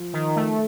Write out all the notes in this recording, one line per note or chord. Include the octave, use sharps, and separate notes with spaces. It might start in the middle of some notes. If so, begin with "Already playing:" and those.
Already playing: F3
D#3
A3